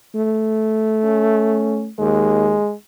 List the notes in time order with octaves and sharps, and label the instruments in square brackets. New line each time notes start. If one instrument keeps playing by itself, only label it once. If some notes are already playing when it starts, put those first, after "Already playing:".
[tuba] A3
[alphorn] C#4
[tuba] D#2 [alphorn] G#3